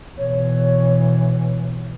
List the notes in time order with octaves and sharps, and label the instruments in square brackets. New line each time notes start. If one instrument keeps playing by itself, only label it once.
[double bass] B2 E3 [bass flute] C#5